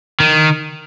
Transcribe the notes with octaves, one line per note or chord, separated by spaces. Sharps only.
D#3